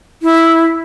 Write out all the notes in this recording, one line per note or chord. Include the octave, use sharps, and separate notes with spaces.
E4